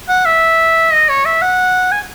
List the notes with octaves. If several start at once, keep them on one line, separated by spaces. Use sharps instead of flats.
F#5
E5
D#5
C#5
E5
F#5
G#5